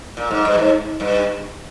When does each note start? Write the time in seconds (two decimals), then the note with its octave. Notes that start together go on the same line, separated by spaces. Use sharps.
0.17 A#2
0.31 G#2
0.45 G2
0.58 G#2
1.00 G2